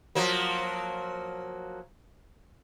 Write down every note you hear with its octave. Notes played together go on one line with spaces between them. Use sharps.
F3 F#3 A#3